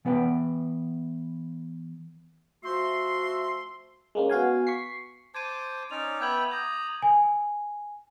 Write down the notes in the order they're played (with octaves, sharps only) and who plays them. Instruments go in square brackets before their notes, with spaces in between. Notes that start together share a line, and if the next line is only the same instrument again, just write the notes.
[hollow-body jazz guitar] E3 B3 B4 G5
[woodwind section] F3 A3 F#4 E5 C6
[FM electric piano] G#3 A#3 C#4
B3 F#4 F5 G#5
C#6 B6 C7
[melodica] C5 A5 D6 [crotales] G#6 D#7
[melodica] C#4 D#4 D5 [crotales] F7
[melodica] B3 E5 G5 [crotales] D6 G#6 F#7
[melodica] A#5 [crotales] D#6 G6
[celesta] G#5